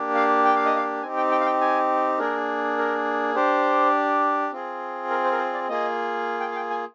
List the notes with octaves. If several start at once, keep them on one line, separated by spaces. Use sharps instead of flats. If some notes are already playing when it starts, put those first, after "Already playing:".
Already playing: A#3 D4 G4
F5
G5
F5
D#5
F5
C4 D#4 G4 G#5
G5
G5
F5
G5
G#5
A#3 D4 G#4 A#4
A#4
D4 G4 C5
C4 F4 G#4
A#4
C5
A#4
C5
D5
A#3 F4 G#4 D#5
G5
F5
G5
G#5